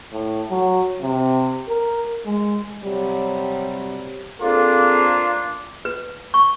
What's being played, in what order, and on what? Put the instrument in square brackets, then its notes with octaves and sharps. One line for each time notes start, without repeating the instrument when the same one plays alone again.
[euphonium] A2
F#3
C3
A#4
G#3
[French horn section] C3 F#3 G3
[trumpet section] A#3 D4 F4 [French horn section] C4 G#4 A4
[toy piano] B4
C#6